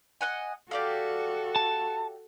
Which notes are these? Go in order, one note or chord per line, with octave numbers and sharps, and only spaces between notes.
D#5 F#5 G#5
F#4 G4 A4 D5 F5
A5